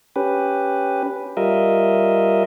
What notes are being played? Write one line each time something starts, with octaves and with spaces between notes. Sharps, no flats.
C#4 G4 B4
G3 F4 A#4 D#5 E5